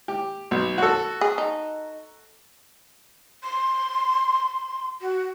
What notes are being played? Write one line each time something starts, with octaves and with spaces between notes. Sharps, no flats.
G4
B1
F#4 A4
G#4
D#4
C6
F#4